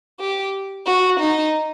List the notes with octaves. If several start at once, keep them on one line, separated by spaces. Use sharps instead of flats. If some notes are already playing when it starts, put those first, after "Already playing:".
G4
F#4
D#4